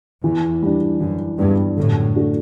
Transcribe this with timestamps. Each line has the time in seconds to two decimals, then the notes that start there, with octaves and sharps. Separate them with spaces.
0.23 E2 E3
0.62 G3 D4
1.00 F#2 E3
1.39 E2 G2 G3 D4
1.77 F#2 A2 D3
2.16 A3 D4 F#4